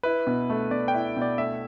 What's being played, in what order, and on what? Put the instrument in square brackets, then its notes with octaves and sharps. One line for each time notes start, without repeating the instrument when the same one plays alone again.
[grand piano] E4 [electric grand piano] B4
[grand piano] B2
A3
[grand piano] B2 [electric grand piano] D5
[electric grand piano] G5
[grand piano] E4
[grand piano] B2 [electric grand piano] D5
[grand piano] A3 [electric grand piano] E5